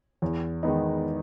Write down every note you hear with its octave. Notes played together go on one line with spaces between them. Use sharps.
E2
D#3 G#3 B3 D#4